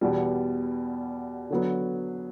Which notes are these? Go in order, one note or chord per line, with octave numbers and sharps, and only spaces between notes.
E2 B2 G3
D3 F#3 B3